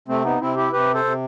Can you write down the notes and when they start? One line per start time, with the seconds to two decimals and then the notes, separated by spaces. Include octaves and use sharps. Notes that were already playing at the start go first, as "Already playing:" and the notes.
0.08 C3 A3 C4
0.24 B3 D#4
0.40 C3 C4 E4
0.56 E4 G4
0.72 C3 G4 B4
0.94 A4 C5
1.04 C3